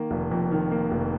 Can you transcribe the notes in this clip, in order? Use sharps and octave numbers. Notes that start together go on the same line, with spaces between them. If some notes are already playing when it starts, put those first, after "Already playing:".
Already playing: D#3 A#3
F1
F2
D#3
A#3
F1